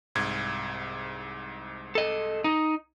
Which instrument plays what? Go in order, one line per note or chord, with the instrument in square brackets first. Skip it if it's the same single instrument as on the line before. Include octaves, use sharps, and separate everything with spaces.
[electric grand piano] C2 G#2 G#6
[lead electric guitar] A4 D#5
D#4